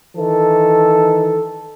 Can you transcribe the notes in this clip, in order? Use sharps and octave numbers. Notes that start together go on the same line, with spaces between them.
D#3 E3 A4